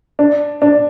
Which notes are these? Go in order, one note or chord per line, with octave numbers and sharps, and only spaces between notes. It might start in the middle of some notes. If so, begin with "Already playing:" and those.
D4
D4